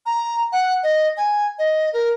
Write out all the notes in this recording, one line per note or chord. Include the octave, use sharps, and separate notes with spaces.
A#5
F#5
D#5
G#5
D#5
A#4